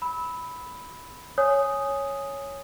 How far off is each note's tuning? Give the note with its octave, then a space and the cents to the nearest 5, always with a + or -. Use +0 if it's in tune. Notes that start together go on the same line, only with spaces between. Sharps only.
B5 +0 E6 -25
C#5 +0 G#5 +0 D#6 +0